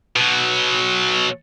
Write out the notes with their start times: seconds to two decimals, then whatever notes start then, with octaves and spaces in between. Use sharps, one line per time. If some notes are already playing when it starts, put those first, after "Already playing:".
0.16 B2 F#3